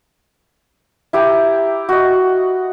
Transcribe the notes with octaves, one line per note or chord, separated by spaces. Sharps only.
E4 G4 G5 A#5
F#4 D#5